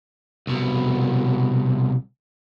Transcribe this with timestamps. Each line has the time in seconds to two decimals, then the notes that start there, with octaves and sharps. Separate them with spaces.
0.47 C2 B2